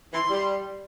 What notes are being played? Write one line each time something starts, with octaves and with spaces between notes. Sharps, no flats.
E3 C6
G3